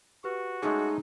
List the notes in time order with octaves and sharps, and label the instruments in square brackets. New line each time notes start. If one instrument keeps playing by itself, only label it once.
[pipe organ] F#4 [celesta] G4 B4
[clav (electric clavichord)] G#3 A3 C#4 [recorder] D#4 [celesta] G#4